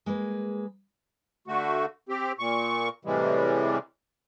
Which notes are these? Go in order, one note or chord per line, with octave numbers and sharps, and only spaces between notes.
G#3 A#3 G#4 B4
D3 A3 F#4
C4 G4
A#2 C#6
A2 C3 E3 G3 G#3